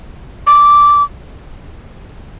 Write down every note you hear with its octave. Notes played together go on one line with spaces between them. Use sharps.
D6